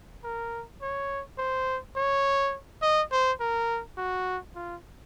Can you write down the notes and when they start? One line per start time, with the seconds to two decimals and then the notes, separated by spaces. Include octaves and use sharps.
0.24 A#4
0.82 C#5
1.38 C5
1.96 C#5
2.82 D#5
3.12 C5
3.40 A#4
3.98 F#4
4.56 F4